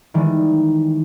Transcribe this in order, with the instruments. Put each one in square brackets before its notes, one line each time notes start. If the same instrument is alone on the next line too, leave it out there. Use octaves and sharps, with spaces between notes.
[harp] D#3 E3 G3 G#3